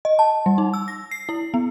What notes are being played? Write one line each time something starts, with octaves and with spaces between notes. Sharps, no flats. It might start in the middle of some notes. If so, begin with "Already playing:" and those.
D#5
A5
G3
D#4
E6
A#6
C7
E4
B3